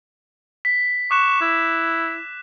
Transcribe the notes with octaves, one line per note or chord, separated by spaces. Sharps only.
B6
C#6 D6 F#6 E7
E4